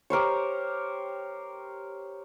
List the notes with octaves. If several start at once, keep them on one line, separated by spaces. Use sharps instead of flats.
G4 A#4 C5 C#5